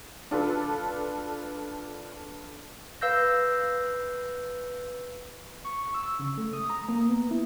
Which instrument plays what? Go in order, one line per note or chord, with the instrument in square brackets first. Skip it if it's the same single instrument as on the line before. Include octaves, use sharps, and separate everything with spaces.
[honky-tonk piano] D4 F4 A4 B4
[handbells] B4 F5 E6 G6 A#6
[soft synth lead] C#6
E6
C#3
A3
D#6
A#5
A#3
B3
E4